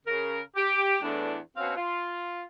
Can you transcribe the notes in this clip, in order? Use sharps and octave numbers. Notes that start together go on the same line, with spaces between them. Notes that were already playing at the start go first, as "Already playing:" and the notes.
C#3 A#4
G4
E2 A2 E3 D4
B2 C4 C#4 F#4 F5
F4